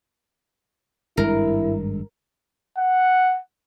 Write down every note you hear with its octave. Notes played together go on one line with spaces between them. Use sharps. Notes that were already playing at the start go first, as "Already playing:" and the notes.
G#1 G2 G#3 E4 A#4
F#5